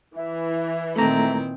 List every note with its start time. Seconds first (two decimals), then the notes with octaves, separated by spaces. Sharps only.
0.16 E3 E5
0.96 A#2 D#3 A3 C4 E5 A#5